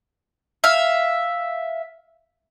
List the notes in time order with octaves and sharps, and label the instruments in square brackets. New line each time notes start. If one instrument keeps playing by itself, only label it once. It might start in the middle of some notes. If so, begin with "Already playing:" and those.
[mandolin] E5 F5